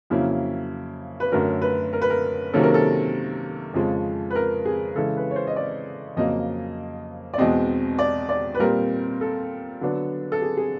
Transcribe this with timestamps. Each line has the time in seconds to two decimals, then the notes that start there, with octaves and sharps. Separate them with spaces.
0.10 F2 C#3 F#3 A#3 C#4 E4
1.20 B4
1.32 F#2 D3 F#3 A3 C#4 A#4
1.62 B4
1.93 A#4
2.02 B4
2.10 A#4
2.53 C3 D#3 F#3 A#3 C#4 A4
2.63 A#4
2.74 A4
3.74 F2 C#3 F3 G#3
4.30 B4
4.35 A#4
4.65 G#4
4.96 C#3 E3 G#3 A4
5.17 B4
5.31 C#5
5.36 C5
5.47 D#5
5.56 D5
6.17 F2 C#3 F#3 A#3 D#5
7.34 D5
7.38 E2 B2 G#3 C4 D#5
7.99 D5
8.29 D5
8.55 B4
8.59 A#2 G3 C4 A#4
9.21 A4
9.81 D3 F#3 B3 D4
10.32 A4
10.42 G#4
10.57 G#4